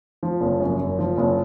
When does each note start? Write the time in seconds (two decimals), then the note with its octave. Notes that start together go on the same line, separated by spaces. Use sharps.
0.23 F3
0.41 F#1
0.60 F#2
0.80 F#1
0.99 F3
1.18 F#1